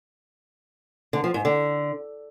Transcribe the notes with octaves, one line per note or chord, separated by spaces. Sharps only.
D3
F3
G#2
D3